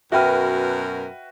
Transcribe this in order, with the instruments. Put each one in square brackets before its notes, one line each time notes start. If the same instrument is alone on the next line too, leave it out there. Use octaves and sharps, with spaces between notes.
[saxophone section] F#2 B2 A#4 [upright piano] F#4 B4 [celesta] E5 G5 F6